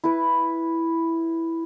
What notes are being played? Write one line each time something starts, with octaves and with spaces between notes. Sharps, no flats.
E4 B4